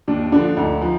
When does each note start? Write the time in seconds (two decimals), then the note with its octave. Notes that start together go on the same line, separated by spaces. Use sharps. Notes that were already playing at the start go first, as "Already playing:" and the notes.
0.08 D#2 D4
0.32 D3 F3 D4
0.57 D2 D#4
0.82 F3